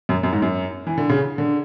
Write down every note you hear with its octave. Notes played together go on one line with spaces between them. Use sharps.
F#2
F#2
G#2
F#2
E3
D3
C#3
D3